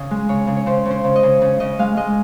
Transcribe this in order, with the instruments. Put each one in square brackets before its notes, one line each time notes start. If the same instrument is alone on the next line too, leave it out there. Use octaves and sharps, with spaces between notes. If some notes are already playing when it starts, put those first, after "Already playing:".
Already playing: [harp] C#3 D#5
G#3
C#3 C#5
C#3
C#5
C#3 C5
C#3
C5
C#3
D#5
C#3
C#3
C#3 D#5
G#3 F5
G#3 D#5